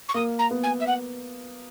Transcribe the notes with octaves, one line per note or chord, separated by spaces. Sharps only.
C#6
A#3 D#6
A#5
B3
G#5
E5
F#5